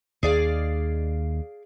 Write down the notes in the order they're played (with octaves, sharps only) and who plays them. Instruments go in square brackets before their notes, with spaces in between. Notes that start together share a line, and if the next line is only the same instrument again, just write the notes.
[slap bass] D#2 D#3 [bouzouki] G#4 D5 F5